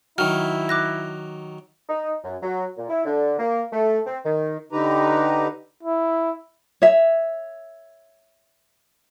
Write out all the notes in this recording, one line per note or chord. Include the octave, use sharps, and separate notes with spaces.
D#3 F#3 E4 F6
D6 F#6 A#6
D#4
F#2
F#3
A#2
E4
D3
A#3
A3
C4
D#3
D3 D#4 G4 B4 A#5
E4
C#5 E5